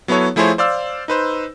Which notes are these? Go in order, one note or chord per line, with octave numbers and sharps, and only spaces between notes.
F#3 B3 E4 A4 C#5
F3 A3 E4 G#4 C5 C#5
C5 D5 F5 E6
D#4 B4 C5